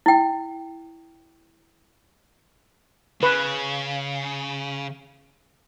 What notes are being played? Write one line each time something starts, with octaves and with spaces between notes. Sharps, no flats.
E4 G5
C#3 B4